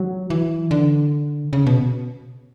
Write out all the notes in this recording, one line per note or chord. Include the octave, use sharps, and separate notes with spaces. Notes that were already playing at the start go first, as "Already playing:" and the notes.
Already playing: F#3
E3
D3
C#3
B2